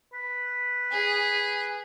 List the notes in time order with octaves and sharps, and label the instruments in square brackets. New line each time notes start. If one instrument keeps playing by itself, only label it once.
[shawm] B4
[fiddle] G#4